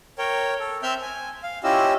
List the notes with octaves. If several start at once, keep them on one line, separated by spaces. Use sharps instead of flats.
A#4 C#5 G5
A4
C4 E5 E6 F6 G6
G#5
F5
C#4 E4 F4 G4 D#5 E6